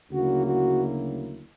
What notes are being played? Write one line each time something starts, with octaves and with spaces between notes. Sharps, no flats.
D2 C#3 F#3 A#3 E4 F#4
F#4